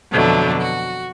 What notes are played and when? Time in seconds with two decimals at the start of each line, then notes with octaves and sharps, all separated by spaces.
0.11 F2 B2 D3 F#3 A3
0.60 F#4